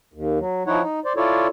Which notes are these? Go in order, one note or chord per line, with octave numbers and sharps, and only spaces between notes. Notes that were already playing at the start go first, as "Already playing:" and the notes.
D#2
F#3
F3 D#4 E4 C#5 F#5
D#4
C5 D5
E4 F4 A4 C#5 D5